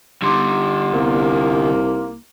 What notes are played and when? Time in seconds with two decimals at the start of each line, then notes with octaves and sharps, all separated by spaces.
0.22 D3 G3 D#4 C6 D6
0.93 C2 A#3